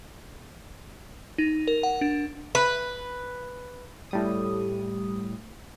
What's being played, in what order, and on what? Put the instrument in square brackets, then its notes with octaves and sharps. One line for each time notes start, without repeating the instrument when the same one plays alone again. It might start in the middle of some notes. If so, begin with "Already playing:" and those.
[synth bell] D#4
A#4
F#5
D4
[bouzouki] B4
[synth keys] A2 G3 D#6